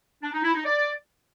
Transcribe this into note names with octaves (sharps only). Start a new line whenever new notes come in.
D4
D#4
E4
D#4
D5